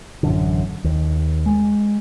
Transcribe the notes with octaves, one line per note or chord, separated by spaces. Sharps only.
A1 F#2 D3
D#2
G#3